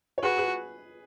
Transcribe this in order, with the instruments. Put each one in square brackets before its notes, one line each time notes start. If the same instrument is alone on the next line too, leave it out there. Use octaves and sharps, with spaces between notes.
[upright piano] C#5
[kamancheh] F#4 [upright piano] G#4 B4
[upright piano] G#4 B4